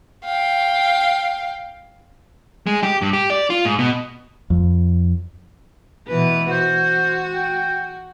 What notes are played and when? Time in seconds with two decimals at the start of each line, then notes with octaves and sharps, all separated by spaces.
0.25 F5 G5
2.67 G#3
2.83 G4
3.02 G2
3.13 G4
3.30 D5
3.50 F4
3.65 G#2
3.79 B2
4.50 F2
6.08 B2 E3 B4
6.51 F#4 C5
7.34 G5